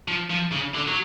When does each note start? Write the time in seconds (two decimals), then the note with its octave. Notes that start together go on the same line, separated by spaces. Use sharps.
0.08 F3
0.30 F3
0.52 C#3
0.75 D3
0.88 F#3